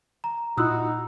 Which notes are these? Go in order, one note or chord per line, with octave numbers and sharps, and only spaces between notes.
A#5
A#2 D#4 E4 F#4 D#6 E6 F#6